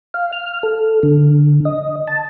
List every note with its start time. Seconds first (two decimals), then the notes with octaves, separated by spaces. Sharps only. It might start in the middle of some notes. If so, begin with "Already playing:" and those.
0.14 F5
0.33 F6
0.63 A4
1.03 D3
1.65 D#5
2.08 A5